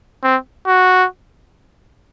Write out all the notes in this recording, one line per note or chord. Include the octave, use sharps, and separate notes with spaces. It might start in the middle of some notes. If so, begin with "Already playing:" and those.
C4
F#4